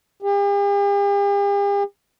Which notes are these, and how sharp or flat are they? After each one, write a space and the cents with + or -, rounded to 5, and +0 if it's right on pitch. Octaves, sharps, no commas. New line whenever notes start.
G4 +45